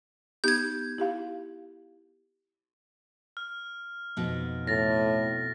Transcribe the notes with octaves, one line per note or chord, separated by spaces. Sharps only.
B3 D#4 G4 G6 G#6
E4 G4 F5
F6
F2 B2 D#4
A2 A6 A#6